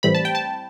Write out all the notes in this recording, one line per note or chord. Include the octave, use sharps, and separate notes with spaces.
A2 E3 G3 C4 B5
A5
G5
A5